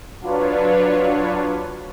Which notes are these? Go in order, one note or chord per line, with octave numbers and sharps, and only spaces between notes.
F#3 D4 F4 B4 C#5